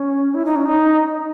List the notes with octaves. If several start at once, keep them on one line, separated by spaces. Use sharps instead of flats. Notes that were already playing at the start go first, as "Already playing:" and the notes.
Already playing: C#4
E4
D#4
C#4
D#4